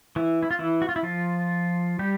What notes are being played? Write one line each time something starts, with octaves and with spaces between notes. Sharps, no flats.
E3 E4
E4
F4
E3 E4
F#4
F4
E4
F3 F4
G3 G4